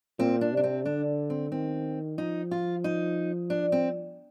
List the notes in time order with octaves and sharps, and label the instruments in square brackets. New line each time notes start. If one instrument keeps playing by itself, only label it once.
[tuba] A#2 [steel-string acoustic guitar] C4
[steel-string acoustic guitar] D4
[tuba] C3 [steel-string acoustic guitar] D4
[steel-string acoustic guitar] C4
[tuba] D3 [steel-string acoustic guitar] D4
[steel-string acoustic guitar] C4
[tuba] D#3 [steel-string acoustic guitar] C4
[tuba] F3 [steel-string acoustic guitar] D#4
[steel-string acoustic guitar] F4
D#4
D4
C4